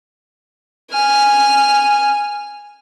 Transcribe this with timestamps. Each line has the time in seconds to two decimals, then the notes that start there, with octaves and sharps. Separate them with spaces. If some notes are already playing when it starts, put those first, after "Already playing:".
0.91 G#5 F6